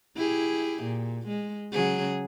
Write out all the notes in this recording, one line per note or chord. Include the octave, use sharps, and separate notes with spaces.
E4 G4 G#4
A#2
G#3
C#3 F#3 G#4